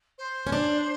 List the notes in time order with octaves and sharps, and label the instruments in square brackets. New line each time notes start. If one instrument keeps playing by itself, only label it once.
[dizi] C5
[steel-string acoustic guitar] C#4
D4